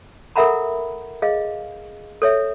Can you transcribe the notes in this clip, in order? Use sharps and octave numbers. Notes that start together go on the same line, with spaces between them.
A4 A#4 E5 F#5 A#5 B5
G#4 D#5 F5
A4 C#5 E5